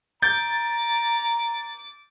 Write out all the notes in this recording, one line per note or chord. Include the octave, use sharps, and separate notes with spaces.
A#5 D6 G6 A6